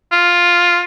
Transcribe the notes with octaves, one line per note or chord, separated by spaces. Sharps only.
F4